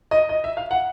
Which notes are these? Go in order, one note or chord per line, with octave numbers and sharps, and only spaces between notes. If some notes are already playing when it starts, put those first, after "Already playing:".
D#5
D#5
E5
F5
F#5